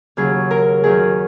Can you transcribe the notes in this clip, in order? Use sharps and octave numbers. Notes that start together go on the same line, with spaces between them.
D#2 C#3 F#3 G#4
A#4
F#2 D#3 F#3 G#4